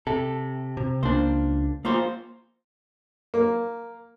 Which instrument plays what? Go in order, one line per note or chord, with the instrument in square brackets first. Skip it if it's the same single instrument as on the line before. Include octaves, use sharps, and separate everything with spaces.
[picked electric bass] C3 [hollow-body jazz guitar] A4
[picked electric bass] C3
[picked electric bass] C#2 D4 [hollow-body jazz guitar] A#3 C5
[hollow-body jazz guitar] A#3 F4 C5
[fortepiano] A#3